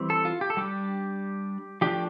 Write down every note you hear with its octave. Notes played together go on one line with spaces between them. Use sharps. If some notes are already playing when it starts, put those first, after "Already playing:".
Already playing: E3 G3 C4
A4
F4
G4
A4
G3 D4 G4
F3 A3 D4 G4